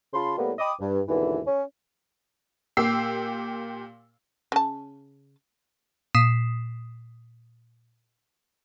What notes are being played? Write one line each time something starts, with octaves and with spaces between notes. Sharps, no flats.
C#3 F4 A5 B5 C6
A2 G3 A#3 B3
D#5 G5 B5 D6 D#6
G2
D#2 G#2 B2 D3 E3
C#4
A#2 G4 E6 C7
C#3 A5
A#2 D#6 B6 C7 E7